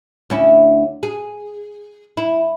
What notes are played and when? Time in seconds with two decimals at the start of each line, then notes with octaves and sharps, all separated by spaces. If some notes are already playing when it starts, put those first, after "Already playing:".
0.30 D2 C#4 E4
1.03 G#4
2.17 E4